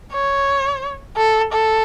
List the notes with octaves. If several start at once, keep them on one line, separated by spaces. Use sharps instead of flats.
C#5
A4
A4